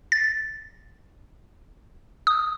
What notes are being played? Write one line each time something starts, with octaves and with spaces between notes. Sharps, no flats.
A6
D#6